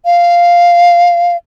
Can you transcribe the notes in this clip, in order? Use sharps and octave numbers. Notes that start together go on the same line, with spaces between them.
F5